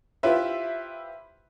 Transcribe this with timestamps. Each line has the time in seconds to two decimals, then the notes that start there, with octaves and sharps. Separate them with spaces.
0.23 E4 F4 G4 B4 C5 E5